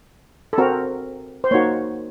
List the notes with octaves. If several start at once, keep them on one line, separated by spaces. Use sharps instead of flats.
A4
C4 F#4 A#4
C5
A#3 D#4 F#4 C#5